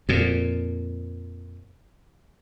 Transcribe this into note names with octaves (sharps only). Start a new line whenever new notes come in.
F2 A#2